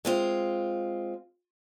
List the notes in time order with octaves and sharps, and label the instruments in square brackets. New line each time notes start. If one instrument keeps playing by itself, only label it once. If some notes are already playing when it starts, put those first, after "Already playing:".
[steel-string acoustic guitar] G#3 C4 F4